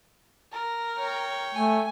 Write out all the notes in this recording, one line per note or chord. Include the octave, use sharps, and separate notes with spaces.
A#4
C#5 G5
A3 G#5